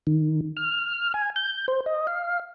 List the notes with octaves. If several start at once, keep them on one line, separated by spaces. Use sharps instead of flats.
D#3
F6
G#5
G6
C5
D#5
F5